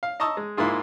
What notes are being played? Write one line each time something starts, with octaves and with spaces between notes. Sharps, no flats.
F5
D#5 A5 A#5 C#6 D#6 E6
G#3
G#2 A#3 E4 F4 G#4